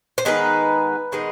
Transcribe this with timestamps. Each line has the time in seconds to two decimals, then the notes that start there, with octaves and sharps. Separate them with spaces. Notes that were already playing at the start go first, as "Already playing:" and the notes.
0.18 C5
0.25 D#3 G#3 B3 D#4 B4
1.12 D#3 G#3 B3 D#4